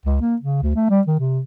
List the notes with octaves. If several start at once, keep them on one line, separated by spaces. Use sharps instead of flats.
C#2
A#3
C#3
D2
A3
G3
D#3
C3